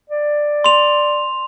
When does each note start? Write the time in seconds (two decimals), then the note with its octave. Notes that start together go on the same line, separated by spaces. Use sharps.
0.09 D5
0.64 C6 F7